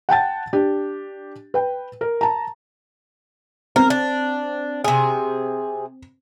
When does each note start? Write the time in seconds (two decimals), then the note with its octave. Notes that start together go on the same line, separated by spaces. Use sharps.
0.09 F#5 G5 A5 A6
0.53 D4 G4
1.54 B4 G5
2.01 A#4
2.21 A5 A#5
3.76 C4 A#4
3.90 D4
4.84 C3 G#4